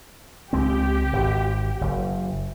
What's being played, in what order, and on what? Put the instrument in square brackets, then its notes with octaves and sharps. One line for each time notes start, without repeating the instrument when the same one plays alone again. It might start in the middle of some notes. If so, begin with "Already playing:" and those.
[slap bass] C#2 G#3 C4 [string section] G4
[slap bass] G#1
F#1